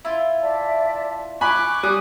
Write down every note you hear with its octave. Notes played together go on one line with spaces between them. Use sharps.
E4 F4
D5 E5 A5
G#5 B5 C#6 D6 F#6
G3 G#5 D#6 G6